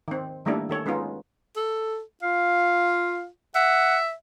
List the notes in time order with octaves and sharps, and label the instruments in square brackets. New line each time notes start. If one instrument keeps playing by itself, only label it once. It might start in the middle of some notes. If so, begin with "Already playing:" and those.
[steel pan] D#3 C4
D#3 G3 A3 A#3 D4 E4
D#3 A4 C#5
G#3 B3 C#4 D#4 F4
[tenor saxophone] A4
[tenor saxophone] F4 [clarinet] F5
[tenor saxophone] E5 [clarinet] F#5